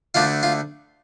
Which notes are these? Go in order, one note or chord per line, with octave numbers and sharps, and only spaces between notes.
D2 D3 A3 D4 F4
F4